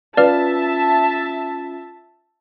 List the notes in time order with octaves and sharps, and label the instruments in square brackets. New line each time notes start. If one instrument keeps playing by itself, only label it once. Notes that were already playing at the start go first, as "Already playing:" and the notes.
[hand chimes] C#4 F4 [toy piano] B4 [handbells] D5 F5 F6 [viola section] E5 A5